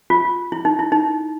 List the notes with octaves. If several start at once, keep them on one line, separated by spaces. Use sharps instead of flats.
F4
E4
D#4
E4
D#4